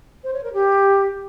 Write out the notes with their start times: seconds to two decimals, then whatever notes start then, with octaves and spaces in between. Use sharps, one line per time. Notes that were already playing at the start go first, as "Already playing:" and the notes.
0.24 C5
0.34 C#5
0.44 A#4
0.53 G4